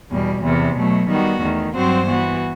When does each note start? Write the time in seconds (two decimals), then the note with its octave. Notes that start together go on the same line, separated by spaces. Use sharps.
0.11 E2 B2 G3
0.43 E2 C3 E3
0.77 B2 F#3 A3
1.09 D#3 G3 B3 F#4
1.41 E2 D#3 A3
1.74 G2 F#3 C4 F#4 C5
2.06 E3 B3 F#4